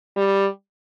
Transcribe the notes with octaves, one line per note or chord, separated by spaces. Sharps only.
G3